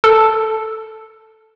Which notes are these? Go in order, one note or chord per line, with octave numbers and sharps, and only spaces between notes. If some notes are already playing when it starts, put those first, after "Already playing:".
A4